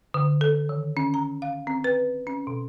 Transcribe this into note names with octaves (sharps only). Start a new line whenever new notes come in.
D3
A4
D#3
C#4
A#5
F5
C4
B4
C#4
B2